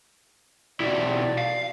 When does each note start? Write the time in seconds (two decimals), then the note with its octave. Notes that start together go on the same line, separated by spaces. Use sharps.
0.80 B1 E4 F#4 D5
1.38 F5